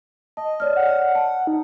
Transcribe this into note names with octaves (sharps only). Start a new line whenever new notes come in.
D#5 A5
C#5 D5 F6
F#5
A5
D#4